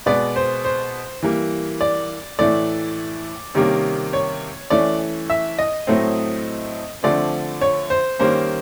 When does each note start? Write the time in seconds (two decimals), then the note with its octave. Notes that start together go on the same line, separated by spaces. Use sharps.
0.06 B2 G#3 B3 D5
0.36 C5
0.65 C5
1.22 E3 G3 A#3
1.81 D5
2.39 A2 E3 A3 D5
3.55 C3 D#3 G3 A#3 C#4
4.13 C#5
4.70 E3 A3 C#4 D5
5.30 E5
5.59 D#5
5.87 A2 F#3 A3 C4
7.03 D3 F3 A3 C4 D5
7.61 C#5
7.90 C5
8.19 D#3 G3 A#3 C#4 C5